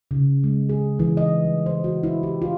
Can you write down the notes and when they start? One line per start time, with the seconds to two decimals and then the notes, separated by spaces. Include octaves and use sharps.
0.11 C#3
0.44 G#3
0.69 G#4
0.99 E3
1.17 D#5
1.44 G3
1.66 C5
1.84 F#4
2.03 E4
2.23 G4
2.42 F4